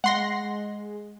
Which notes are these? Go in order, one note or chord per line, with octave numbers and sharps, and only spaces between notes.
G#3 F#5 C6 A#6